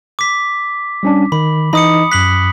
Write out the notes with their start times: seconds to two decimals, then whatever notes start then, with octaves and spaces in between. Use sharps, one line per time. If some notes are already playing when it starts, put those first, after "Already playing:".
0.19 D6 B6
1.03 G3 C#4 D4
1.32 D#3 B5
1.73 E3 D#4 D#5 B5 D#6 C#7
2.12 F#2 F#6 B6 F#7